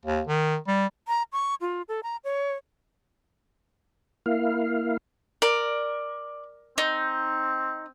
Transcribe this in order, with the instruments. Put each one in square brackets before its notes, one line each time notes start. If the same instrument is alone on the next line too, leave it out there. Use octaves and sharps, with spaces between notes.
[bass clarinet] D#2
D#3
G3
[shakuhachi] A#5
C#6
F4
A4
A#5
C#5
[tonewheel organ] A#3 E4 F5
[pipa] A#4 [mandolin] D5
[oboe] C4 [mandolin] D#4